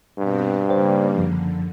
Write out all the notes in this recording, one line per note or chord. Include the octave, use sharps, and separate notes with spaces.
G2 B2 B3 C4
C#3 G3 A#3 C5 D5 G5
F#2 D3 F3